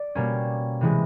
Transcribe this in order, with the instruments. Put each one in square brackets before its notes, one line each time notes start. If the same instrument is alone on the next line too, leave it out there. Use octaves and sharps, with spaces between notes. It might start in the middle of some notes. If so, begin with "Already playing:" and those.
Already playing: [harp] D5
B2 G3 A#3 C#4
C3 E3 G#3